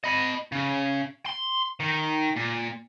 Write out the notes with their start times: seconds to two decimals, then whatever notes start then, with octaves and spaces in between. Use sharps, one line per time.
0.04 D#5 B5
0.52 C#3
1.26 C6
1.80 D#3
2.36 A#2